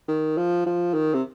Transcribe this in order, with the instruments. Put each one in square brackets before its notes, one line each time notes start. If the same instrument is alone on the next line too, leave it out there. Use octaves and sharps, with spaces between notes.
[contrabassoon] D#3
F3
F3
D#3
C3